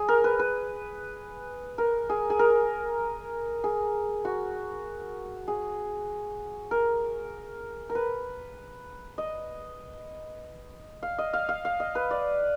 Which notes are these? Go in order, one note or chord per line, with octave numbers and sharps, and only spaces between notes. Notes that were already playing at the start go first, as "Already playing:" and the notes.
Already playing: G#4
A#4
B4
B4
A#4
G#4
G#4
A#4
G#4
F#4
G#4
A#4
A#4
B4
D#5
F5
D#5
F5
F5
F5
D#5
B4
D5